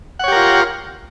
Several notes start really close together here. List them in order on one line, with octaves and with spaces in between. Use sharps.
F#5 C#5 G4 A#4 F4